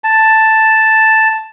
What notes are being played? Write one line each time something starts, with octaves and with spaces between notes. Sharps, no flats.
A5